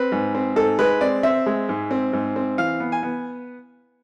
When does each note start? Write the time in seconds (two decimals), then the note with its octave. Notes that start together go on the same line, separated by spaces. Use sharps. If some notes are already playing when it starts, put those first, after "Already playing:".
Already playing: C4 B4
0.12 G#2
0.35 C4
0.56 G#2 A4
0.79 G#3 B4
1.01 C4 D5
1.23 C4 E5
1.46 G#3
1.69 G#2
1.91 C4
2.13 G#2
2.36 C4
2.58 E3 F5
2.80 B3
2.92 G#5
3.03 B3